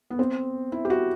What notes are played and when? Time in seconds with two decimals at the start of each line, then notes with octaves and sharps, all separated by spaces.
0.10 B3
0.19 C4
0.72 E4
0.85 G4
0.90 F#4